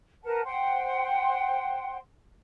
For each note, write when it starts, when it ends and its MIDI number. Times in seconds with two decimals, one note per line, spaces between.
0.23 0.41 70
0.23 0.41 71
0.23 0.41 78
0.23 0.41 81
0.44 1.97 72
0.44 1.97 78
0.44 1.97 79
0.44 1.97 84